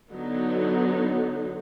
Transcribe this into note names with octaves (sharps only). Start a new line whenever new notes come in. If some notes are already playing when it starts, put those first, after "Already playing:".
D3 F#3 B3 D#4